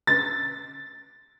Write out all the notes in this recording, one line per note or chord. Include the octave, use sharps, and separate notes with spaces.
A6